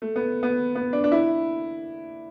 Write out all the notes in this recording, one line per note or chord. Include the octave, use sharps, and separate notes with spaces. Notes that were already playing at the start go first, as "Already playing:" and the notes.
A3
B3
B3
B3
D4
D4
E4